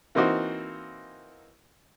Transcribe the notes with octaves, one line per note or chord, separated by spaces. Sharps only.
E3 A#3 C4 D#4 F#4